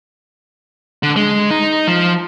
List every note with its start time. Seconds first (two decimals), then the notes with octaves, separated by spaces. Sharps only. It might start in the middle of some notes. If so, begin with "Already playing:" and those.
1.03 D3
1.16 G#3
1.51 D#4
1.88 F3